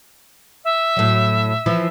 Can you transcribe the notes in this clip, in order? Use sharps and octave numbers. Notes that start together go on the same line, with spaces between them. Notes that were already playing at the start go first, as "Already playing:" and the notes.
E5
A2 F#3
E3 F3 E4